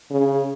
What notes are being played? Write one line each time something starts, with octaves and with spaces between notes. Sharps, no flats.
C#3